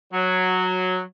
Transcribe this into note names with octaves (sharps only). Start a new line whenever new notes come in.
F#3